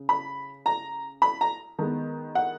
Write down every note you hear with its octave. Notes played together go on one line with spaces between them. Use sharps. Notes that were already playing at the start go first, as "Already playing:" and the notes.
Already playing: C#3
B5
A#5
B5
A#5
D#3 G#3 B3
F#5